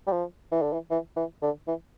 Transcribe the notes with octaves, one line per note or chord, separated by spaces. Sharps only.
G3
F3
E3
D3
E3
E3
E3
D3
E3